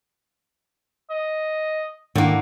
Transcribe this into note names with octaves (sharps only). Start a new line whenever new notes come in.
D#5
G#2 D3 D#3 A#3 E4